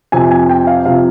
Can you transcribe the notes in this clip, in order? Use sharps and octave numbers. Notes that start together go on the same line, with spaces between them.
F2 C3 F3 G#5
G#5
G5
F5
C3 F3 F5